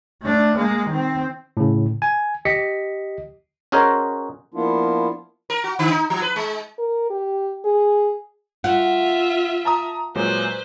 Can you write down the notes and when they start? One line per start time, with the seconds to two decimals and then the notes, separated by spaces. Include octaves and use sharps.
0.23 A3 D4
0.56 G#3 A#3
0.89 D#3 C4
1.57 A2 C#3
2.02 G#5
2.45 G4 D#5 B6 C#7
3.72 C#4 F#4 G#4 A#4 C5 D#5
4.54 F3 A#3 B3 D4 E4 F4
5.50 A#4
5.64 F#4
5.79 D3
5.91 D#4
6.10 F3
6.22 B4
6.36 G#3
6.78 A#4
7.10 G4
7.65 G#4
8.64 F4 F#4 E5
9.65 A5 A#5 D#6
10.16 A#2 F#3 G#3 B4 C5